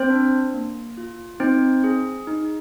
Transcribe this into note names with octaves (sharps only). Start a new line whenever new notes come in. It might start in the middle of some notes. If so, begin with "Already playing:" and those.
Already playing: C4 C5
D4
A#3
F4
C4 D#4 C5
G#4
D#4